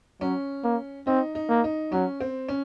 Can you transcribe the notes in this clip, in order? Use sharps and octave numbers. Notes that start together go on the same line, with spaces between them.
F#3 C#4
A#3
C4 D#4
D#4
A#3
D#4
F#3 C#4
C4
C#4